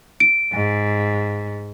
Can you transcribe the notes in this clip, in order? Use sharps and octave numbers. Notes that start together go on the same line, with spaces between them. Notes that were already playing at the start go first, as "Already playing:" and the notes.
D7
G#2